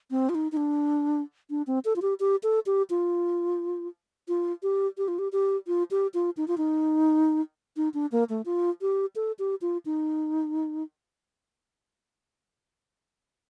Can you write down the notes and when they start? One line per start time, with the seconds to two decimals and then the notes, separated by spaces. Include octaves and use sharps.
0.11 C4
0.29 F4
0.35 D#4
0.52 D#4
0.57 D4
1.50 D4
1.67 C4
1.85 A4
1.96 F4
2.02 G4
2.20 G4
2.43 A4
2.66 G4
2.90 F4
4.28 F4
4.63 G4
4.98 G4
5.08 F4
5.19 G4
5.32 G4
5.67 F4
5.91 G4
6.14 F4
6.37 D#4
6.48 F4
6.58 D#4
7.77 D#4
7.94 D4
8.12 A#3
8.29 A3
8.46 F4
8.81 G4
9.16 A4
9.39 G4
9.62 F4
9.86 D#4